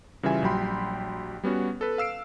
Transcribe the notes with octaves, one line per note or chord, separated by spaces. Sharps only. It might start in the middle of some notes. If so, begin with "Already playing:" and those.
C#3 E3 G3 F4 E5 G#5
A#1 F#3 G3 G5 B5 C6
G3 B3 C#4 F#4
A4 B4
F5 E6 C7 D7